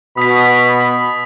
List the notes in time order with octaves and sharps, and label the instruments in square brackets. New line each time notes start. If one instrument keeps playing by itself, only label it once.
[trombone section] B2 [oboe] B5 [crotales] D#6 B6